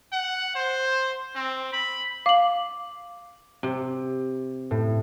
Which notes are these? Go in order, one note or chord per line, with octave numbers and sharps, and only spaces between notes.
F#5
C5
C4
B5
F5 D6 F#7
C3
A2